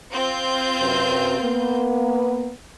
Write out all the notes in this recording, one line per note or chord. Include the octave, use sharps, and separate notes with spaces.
C4 F4 G6
F#2 C3 B4
A#3 B3